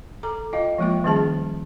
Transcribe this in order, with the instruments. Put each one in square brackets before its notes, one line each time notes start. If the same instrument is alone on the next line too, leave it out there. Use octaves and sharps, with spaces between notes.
[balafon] A4 A#5 D6
F4 D#5 F5 G5
F3 G#3 A#3 F4 G5
D#3 G3 C#4 G#4 A5